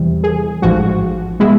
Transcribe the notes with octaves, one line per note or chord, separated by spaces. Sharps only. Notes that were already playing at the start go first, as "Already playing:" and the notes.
Already playing: E2 C3 E3 G3
G#4
A1 G#2 F3 F#4
B2 G#3 E4